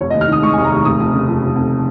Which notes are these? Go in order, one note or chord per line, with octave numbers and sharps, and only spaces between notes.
F1 C#5
D#5
D#2
F6
D#3 D#6
G#3 C#6
G#5
F1
A#5
D#2
F1 D#6
F2
C#3
F3
F1
F2